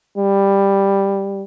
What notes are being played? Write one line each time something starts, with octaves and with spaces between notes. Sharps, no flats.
G3